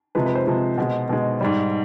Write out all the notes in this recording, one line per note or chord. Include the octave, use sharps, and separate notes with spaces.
C3 F3 G#3 B4
B4
C5
C3 F3 G#3
B2 G#3
B2 G#3
G#2 G3